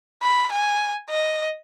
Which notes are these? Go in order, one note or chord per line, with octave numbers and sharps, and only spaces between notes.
B5
G#5
D#5